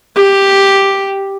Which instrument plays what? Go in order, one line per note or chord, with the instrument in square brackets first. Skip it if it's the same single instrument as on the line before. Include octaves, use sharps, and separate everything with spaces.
[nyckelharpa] G4